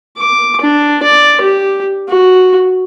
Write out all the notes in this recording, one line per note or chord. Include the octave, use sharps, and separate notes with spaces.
D6
D4
D5
G4
F#4